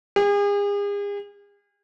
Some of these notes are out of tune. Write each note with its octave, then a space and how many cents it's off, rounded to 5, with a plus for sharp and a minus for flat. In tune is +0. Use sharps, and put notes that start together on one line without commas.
G#4 -40